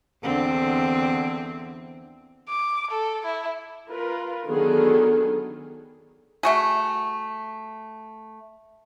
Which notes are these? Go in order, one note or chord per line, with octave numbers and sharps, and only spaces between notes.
E2 D3 C4
D6
A4
E4
F4 A#4 B4
D3 D#3 F#3 B3 G#4 A4
A3 F#4 G#4